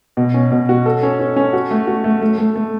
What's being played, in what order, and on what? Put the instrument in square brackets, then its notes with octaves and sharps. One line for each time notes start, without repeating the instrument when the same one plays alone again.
[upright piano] B2
C#4
B2
F#4
A4
C#4
C#4
C#4
F#4
A3
F#4
A3
A3
A3
A3